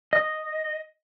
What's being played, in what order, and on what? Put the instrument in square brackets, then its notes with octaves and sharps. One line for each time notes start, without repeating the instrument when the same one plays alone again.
[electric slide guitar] D#5